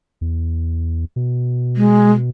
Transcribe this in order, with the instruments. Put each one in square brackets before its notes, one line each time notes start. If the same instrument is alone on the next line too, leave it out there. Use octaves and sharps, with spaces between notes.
[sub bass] E2
B2
[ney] G#3